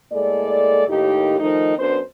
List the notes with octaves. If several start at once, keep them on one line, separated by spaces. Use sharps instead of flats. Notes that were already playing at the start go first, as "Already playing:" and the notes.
A2 G#3 A#3 A4 D5
D#2 A2 D#3 D#4 G4
D#3 F3 A3 D#4
F#2 B3 D4 C5